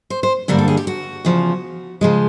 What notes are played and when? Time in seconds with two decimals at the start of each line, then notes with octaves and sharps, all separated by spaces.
0.10 C5
0.23 C5
0.48 G2 D3 G3 A#3 A#4
0.58 A4
0.68 G#4
0.77 G4
0.87 F#4
1.25 E2 C#3 F3
2.01 C#3 F3 G#3